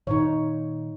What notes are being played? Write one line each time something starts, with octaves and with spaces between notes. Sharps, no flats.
A#2 D#3 D#4 C#5